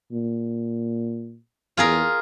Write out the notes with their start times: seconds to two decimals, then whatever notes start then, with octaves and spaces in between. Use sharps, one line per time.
0.11 A#2
1.77 E2 F4 G#4 A#4